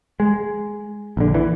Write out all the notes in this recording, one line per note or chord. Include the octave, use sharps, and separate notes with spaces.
G#3
A#1 D3
E3